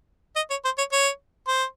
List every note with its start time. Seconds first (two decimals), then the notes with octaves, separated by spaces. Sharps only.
0.36 D#5
0.51 C#5
0.65 C5
0.78 C#5
0.92 C#5
1.48 C5